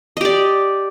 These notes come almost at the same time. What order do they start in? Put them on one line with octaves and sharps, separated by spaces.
D#5 G4 D5